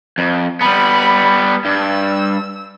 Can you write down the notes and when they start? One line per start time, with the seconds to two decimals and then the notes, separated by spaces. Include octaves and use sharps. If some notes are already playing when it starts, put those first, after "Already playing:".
0.18 F2
0.61 G3 B3 B5
1.65 G2 E6